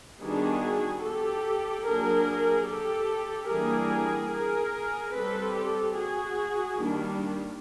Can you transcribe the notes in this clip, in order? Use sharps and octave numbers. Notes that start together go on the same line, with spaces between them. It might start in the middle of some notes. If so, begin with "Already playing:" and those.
D#3 G3 B3 D4 F#4 G#4
G4 A4
F#3 A#3 D4 G#4 A#4
G4 A4
E3 G3 A#3 D4 G#4 A#4
G#4 A#4
G3 C4 A4 B4
G4 A4
F#4 G#4
D#3 G3 A#3 D4